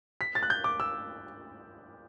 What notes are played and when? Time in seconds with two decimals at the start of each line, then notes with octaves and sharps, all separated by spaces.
0.21 B6
0.35 A6
0.43 F#6
0.50 G6
0.64 D6
0.80 E6